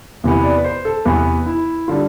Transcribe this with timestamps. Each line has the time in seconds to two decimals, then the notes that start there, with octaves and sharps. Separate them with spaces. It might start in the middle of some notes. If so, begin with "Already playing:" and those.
0.24 E2 C3 E3 B3
0.44 D5
0.57 B4
0.65 C5
0.85 A4
1.05 E2 C3 E3 B3 B4
1.46 E4
1.88 D3 G3 F4